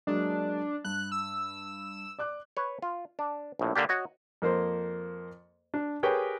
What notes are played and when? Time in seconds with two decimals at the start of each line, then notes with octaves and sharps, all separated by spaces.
0.07 F#3 G#3 A#3 D4
0.85 G2 F#6
1.12 E6
2.19 D5 D6 F#6
2.57 B4 C#5
2.82 F4
3.19 D4
3.59 A#1 A2
3.75 D3 A#3 D4 G4
3.89 F#4 C#5 D#5
4.42 F2 A#3 C5 C6
5.74 D4
6.03 G4 G#4 A#4 B4 C#5 G5